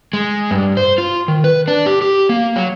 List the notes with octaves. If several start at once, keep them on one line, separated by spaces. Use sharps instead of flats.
G#3
G2
C5
F4
D#3
B4
D4
G4
G4
A#3
F#3